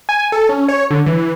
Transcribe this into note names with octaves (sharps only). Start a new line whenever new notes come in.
G#5
A4
C#4
C#5
D3
E3